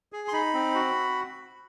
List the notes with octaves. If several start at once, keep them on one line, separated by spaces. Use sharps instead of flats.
G#4
C6
D#4 B5
C4
F#4